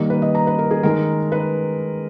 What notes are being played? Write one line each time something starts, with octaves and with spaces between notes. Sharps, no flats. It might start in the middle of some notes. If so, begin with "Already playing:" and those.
Already playing: D#3 G3 A#3
B4
D#5
A#5
B4
A#4
G#4
D#3 G#3 A#4
B4